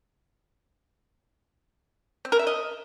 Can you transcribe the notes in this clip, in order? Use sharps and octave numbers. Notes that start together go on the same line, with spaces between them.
C4
A#4
E5
D#5